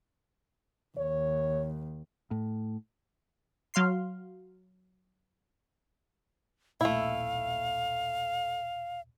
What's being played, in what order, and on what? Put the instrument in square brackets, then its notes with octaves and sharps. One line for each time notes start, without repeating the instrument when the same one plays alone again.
[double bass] D#2 [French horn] C#5
[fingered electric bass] A2
[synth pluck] F#3 F5 C6 C7
[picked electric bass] D#1 B1 A#2 [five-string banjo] A3 E4 [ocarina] F5